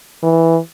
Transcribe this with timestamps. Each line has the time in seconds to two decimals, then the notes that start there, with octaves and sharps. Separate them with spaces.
0.23 E3